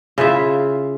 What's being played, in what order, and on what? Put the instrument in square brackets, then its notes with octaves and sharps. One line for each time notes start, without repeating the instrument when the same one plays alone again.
[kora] C#3 E4 F4 E5